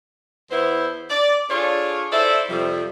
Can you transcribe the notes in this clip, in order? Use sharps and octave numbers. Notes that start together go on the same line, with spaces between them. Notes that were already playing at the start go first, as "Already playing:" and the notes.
E2 B3 E4 C5
D5
D4 F4 G#4 A4 C#5 D5
E4 A4 C5 D5 E5
F2 C3 F3 G3